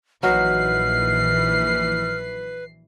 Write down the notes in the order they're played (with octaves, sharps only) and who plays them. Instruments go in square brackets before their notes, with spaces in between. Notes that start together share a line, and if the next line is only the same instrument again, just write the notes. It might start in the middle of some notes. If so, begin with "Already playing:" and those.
[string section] A#1 E3 C7 [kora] F#3 D#4 [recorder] B4 [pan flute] F6